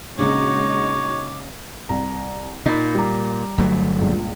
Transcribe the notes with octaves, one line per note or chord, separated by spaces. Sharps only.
A#1 C#3 G#3 D#4 F#4 C#5 D6
C2 A#5
A#2 D#4 B5
G3 A#5
G1 F#3 A3
C#2 G2 A#2